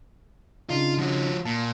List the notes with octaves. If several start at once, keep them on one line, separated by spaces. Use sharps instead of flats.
C#3 D4 D#4 F4
F3 F#4
A#2 A5